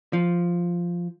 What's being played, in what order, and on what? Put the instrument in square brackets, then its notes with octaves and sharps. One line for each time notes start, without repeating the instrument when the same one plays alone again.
[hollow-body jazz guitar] F3